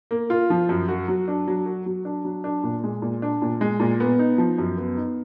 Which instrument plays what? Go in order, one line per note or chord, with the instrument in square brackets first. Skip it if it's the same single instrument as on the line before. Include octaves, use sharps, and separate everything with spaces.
[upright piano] A#3
F4
F3
F#2
F#4
F#3
D4
F#3
F#4
F#3
D4
F#3
D4
A#2
G#3
A#2
D4
A#2
G#3
A#2
B3
D#4
F3
F#2
B3
D#4